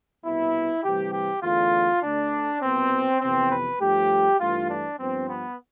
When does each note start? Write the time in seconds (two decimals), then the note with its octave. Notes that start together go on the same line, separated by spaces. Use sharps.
0.24 C2 B2 B3 E4
0.84 D2 C3 E3 G3 G4
1.13 G4
1.43 E2 D3 A3 F4
2.03 D2 D3 A3 D4
2.62 C2 B2 B3 C4
3.21 F2 C3 E3 B3 C4
3.50 B4
3.80 G2 F3 A3 G4
4.39 G2 E3 A3 F4
4.70 D4
4.99 G2 F3 B3 C4
5.29 B3